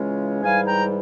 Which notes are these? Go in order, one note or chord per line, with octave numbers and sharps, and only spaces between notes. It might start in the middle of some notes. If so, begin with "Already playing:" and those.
Already playing: C#3 E3 G#3 C#4 F4
G#2 E3 G3 F5 G#5
G5 A#5